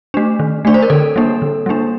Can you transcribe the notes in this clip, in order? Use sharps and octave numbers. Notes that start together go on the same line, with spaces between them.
A3 D4
D#3
A3 D4 D5
C5
A#4
D3 A4
G3 A#3 D4
D3
G3 A#3 D4